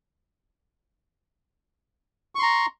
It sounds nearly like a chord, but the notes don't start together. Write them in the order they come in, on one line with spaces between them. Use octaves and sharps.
C#6 C6 A#5